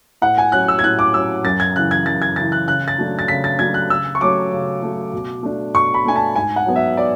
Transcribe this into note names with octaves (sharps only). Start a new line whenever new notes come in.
A2 F#5
G#5
F#3 C#4 F#6
E6
G#6
A2 F#6
D6
F#3 C#4 E6
F#2 A6
G#6
C#3 E3 F#6
G#6
F#2 A6
G#6
C#3 E3 A6
F#6
C#3 F#6
A6
F#3 A3 D4
A6
C#3 B6
A6
F#3 A3 D4 G#6
F#6
C#3 E6
C#6
F#3 A3 C#4 D6
C#3
F#3 A3 C#4
B2
A3 D4
B2 C#6
B5
A3 D4 G#5
A5
G#2 G#5
F#5
F#3 B3
E5
D5